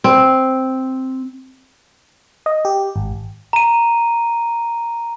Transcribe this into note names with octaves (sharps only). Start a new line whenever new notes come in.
C4
D#5
G4
G#1
A#5 D#7